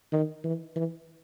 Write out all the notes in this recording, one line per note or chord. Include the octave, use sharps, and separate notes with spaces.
D#3
E3
E3